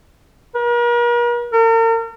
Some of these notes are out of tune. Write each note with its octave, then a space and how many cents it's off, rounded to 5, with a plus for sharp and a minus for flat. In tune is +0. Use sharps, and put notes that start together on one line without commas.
A#4 +45
A#4 -40